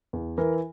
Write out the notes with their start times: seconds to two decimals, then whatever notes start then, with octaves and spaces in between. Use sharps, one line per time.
0.13 E2
0.38 E3 A#4